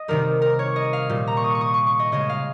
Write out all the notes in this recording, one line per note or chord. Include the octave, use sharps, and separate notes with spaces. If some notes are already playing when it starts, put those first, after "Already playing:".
Already playing: D#5
C3 D#3 G3 A#4
A#4
C#5
D#5
F5
A#2 G3
A#5
C#6
D#6
C#6
D#6
C#6
C#6
D#5
C#3 G#3 D#5
F5